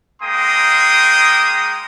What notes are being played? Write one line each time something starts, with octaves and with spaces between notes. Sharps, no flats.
G#3 A#3 G5 C6 D#6